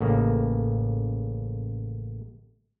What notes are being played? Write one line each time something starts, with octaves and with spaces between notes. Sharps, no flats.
A1 C#3 A#3